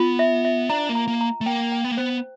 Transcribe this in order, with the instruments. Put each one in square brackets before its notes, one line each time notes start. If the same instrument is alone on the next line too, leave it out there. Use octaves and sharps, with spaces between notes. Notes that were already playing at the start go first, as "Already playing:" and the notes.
Already playing: [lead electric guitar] B3 [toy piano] F4
[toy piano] E5
E5
[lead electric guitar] D4 [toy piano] A#5
[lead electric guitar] A#3
[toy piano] A#5
[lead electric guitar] A#3
[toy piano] A#5
[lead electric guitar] A3
[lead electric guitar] A#3 [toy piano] G5
[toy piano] G5
[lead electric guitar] B3
A#3
[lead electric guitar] B3 [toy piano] C5